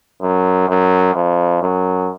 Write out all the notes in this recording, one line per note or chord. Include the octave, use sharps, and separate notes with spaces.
F#2
F#2
F2
F#2